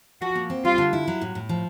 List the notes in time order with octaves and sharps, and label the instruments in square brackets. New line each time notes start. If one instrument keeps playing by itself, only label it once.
[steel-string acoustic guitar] F3 [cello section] F#4
[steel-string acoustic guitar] A#2
C4
[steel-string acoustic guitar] G3 [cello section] F4
[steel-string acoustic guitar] D3
E4
F#3
A2
A2
F3